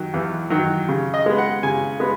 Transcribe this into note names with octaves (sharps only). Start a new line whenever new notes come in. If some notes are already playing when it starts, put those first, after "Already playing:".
Already playing: D#3 F#3
E2
D#3 F#3
C#3
D#5
G#3 B3
F#5
C#3 G#5
G#3 B3